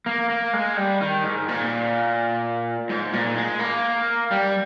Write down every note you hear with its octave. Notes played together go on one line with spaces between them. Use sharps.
A#3
A#3
G#3
G3
D#3
G#2
A#2
G#2
A#2
G#3
A#3
G3